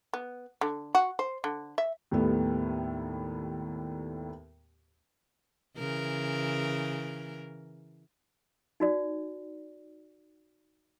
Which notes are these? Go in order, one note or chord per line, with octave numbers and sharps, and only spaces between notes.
B3
D3
F#4
C5
D3
E5
D#2 A2 G3 A3 B3
C#3 E3 A#4
D#4 F#4 D5